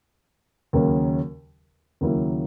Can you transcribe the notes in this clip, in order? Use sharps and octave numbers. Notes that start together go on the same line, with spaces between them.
D#2 C#3 F#3 A#3 C#4
D#2 C#3 F#3 A#3 E4